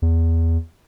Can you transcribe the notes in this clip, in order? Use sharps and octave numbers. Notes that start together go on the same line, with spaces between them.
E2